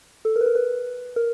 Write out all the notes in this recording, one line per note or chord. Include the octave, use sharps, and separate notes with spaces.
A4
A#4
B4
A#4
B4
A#4